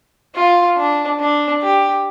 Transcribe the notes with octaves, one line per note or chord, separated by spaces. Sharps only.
F4
D4
D4
G4